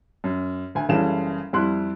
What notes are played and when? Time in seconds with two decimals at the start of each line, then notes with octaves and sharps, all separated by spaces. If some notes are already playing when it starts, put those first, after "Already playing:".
0.24 F#2
0.75 D2 G#5
0.89 F#1 C#3 E3 G3 A4 E7
1.53 F2 G3 E4 C6 F#6